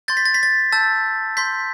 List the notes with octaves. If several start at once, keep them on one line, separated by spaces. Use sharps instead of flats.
C6 G6 A6
B6
A6
B6
A6
A5 E6 G6 A6
C6 G6 B6